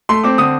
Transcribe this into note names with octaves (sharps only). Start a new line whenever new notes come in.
A3 C6
C4 D6
D3 D#6